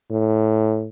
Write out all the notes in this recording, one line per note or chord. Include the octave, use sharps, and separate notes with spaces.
A2